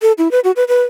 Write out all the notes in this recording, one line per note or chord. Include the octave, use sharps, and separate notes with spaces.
A4
E4
B4
F#4
B4
B4